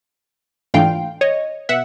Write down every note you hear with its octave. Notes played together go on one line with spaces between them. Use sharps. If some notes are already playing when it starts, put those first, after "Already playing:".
G#2 E3 A3 D4 F4 F5 G5
C#5 D#5
B2 E5 F#5